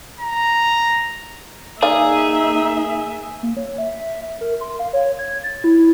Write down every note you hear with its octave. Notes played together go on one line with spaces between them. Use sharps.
A#5
A#3 D#4 G#4 D5 E5 F5
A#3
C#5
E5
A#4
C6
F5
C#5
G#6
A6
E4